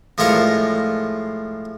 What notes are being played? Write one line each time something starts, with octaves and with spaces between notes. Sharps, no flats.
A2 F3 G#3 F4 A#4 C#6